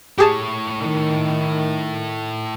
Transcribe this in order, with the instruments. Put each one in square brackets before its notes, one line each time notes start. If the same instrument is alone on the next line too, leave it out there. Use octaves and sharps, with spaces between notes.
[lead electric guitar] A2 C#5 [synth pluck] G4 G#4 A5
[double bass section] D#3